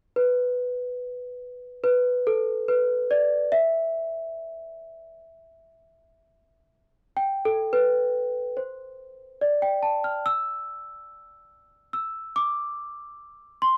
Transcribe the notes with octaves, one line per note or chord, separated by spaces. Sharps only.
B4
B4
A4
B4
D5
E5
G5
A4
B4
C5
D5
G5
A5
F6
E6
E6
D6
C6